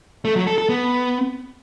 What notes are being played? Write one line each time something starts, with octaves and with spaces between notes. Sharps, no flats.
A3
F#3
A4
A4
B3